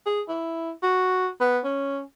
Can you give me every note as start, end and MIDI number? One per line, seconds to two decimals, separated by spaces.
0.06 0.21 68
0.28 0.71 64
0.83 1.28 66
1.40 1.59 59
1.64 2.00 61